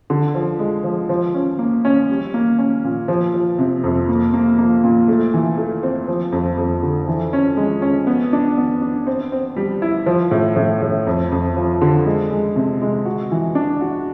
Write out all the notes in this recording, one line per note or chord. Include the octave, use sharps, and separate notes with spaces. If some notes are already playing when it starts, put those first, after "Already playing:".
D3
F3
G#3
F3
F3
C#4
A#3
C#4
G3
A#3
C#4
A#2
F3
F3
C3
F2
A#3
A#3
A#3
A#2
A3
E3
A3
C4
F3
F2
F2
D3
E3
C#4
G#3
C#4
B3
D4
B3
D4
C4
C4
G3
E4
F3
A2
A2
A2
F2
F2
F3
D3
G#3
G#3
C3
G#3
F#4
E3
D4
F#4